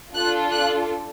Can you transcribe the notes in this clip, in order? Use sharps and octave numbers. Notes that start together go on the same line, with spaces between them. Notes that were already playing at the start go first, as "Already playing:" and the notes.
D4 F4 A4 F#6
F#6